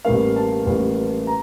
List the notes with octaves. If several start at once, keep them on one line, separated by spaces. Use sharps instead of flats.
A1 A2 G3 A#3 F5
A5
A1 A2 G3 A#3
A#5